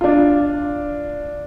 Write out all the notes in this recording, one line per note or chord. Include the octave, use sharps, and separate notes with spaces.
D4 F4